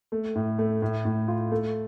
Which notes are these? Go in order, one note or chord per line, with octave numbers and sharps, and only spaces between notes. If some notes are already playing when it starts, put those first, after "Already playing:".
A3
A2
A3
A2
A2
F4
A3